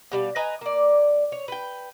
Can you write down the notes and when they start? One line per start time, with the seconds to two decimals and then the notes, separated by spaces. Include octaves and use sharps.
0.12 B2 G3 F5
0.36 B4 D#5 G#5 A#5
0.61 A#3 D5
1.32 C#5
1.48 B4 G5